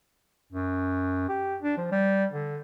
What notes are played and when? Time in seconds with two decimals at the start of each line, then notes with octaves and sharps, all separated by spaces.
0.53 F#2
1.29 G4
1.63 D4
1.77 F3
1.92 G3
2.33 D3